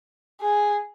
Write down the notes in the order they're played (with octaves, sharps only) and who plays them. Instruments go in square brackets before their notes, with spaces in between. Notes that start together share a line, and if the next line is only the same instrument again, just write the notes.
[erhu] G#4